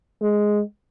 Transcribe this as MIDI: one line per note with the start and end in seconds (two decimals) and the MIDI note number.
0.21 0.62 56